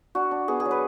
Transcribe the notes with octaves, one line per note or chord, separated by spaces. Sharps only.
D4 F#4
D4
B3 G#4
G#4
F#3
B4